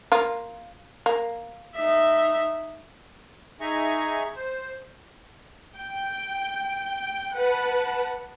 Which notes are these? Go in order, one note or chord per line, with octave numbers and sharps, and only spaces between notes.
A#3 F4
A#3
D#4 E5
D#4 G#4 E5 G#5 A#5 C#6
C5
G5
B4 F#5 A5